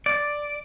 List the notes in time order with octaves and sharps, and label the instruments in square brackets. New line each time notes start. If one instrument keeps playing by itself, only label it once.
[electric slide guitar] D5